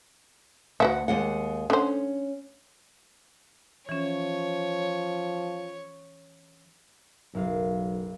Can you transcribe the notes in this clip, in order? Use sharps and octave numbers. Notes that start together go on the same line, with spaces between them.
D2 F#4 B4 E5 F#5
D#2 G#3 F#5
D3 C#4 C5
E3 F3 C#4 C#5
F#1 B1 F5